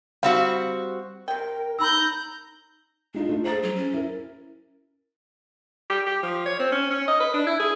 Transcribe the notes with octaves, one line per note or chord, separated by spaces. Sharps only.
G3 C4 F#4 F5
C3 A#4 G5
D#4 A#5 B5 E6 F#6 G6
G#3 D4 D#4 F4
A3 F4
G#4 C5 A#5 A6
F#3
C#4
E4 A#4
G4
G4
F3
C#5
C4
C#4
C#4
D#5
B4
D4
E4
G#4